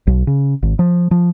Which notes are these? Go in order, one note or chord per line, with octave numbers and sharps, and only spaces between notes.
B1
C#3
G#1
F3
F3